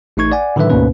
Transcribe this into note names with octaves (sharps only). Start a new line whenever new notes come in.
A1 A3 D#4 C#6 G#6
D5 F#5 G#5
A2 D3 D#3 F#3 B4 E5
D2 G#2 B2 A#3 C#4 B4